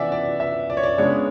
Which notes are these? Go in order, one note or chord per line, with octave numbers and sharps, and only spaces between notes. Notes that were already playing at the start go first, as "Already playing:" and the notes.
Already playing: C#3 E3 B3 D5 E5 F#5 G#5
D5
E5
D5
C#5
D5
C#3 G#3 B3 D4 C#5